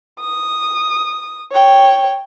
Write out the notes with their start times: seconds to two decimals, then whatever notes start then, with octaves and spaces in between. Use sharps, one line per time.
0.21 D#6
1.52 C#5 G5